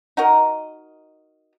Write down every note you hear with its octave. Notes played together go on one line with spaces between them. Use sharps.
D#4 F#4 A#4 D#5